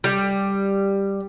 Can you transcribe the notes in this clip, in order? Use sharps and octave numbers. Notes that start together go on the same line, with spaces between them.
G3